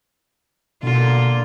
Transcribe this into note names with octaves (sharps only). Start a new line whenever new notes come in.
B2 D3 A#3 F4